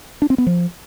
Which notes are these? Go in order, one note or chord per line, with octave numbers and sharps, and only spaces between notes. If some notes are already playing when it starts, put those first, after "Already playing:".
D4
C4
B3
F3